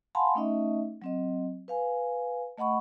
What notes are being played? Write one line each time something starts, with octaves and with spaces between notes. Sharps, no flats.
F5 F#5 G#5 A5 B5 C6
A3 C#4 D#4 D#5 E5
F#3 C4 D#5
B4 F5 G#5
A3 D#5 F#5 B5 C#6